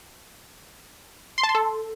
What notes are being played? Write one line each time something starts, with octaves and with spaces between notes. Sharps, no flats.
C6
A5
C6
A4